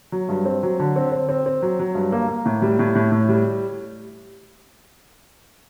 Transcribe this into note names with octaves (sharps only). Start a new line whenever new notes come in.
F#3
G2
C4
F#3
D3
C4
C4
C4
C4
F#3
F#3
G2
A#3
A#3
A2
G3
A2
A2
A2
G3